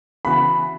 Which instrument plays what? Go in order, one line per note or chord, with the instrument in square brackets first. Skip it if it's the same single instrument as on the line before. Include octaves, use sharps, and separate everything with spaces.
[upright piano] C#3 E3 B3 F#4 [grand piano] B5